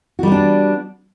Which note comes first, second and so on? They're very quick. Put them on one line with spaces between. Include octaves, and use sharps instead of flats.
F#4 G3 B3 D4